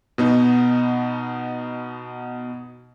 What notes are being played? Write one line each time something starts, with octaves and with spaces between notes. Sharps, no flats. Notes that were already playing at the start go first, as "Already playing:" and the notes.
B2 B3 D#4